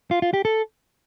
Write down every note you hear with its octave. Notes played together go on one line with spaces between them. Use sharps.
F4
F4
G4
A4